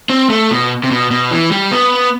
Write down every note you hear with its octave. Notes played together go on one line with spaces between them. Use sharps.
C4
A3
B2
C3
B2
B2
E3
G3
B3